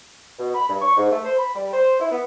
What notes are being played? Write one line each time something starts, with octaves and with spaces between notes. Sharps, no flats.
B2
B5
G2
C#6
G#2
A3
C5
B5
G3
C5
E4
B3